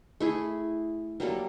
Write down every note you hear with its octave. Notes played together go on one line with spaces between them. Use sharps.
A3 E4 G#4
F#3 G3 A#3 A4